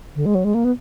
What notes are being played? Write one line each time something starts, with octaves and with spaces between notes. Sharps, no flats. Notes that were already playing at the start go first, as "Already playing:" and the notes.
D3
G#3
F#3
G#3
A#3
B3